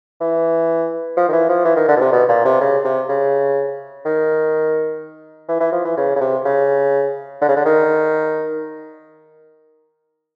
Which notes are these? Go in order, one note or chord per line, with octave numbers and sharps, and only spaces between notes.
E3
F3
D#3
E3
F3
E3
D#3
D3
B2
C3
B2
A#2
C3
C#3
C3
C#3
D#3
E3
E3
F3
E3
C#3
C#3
C3
C#3
D3
C#3
D3
D#3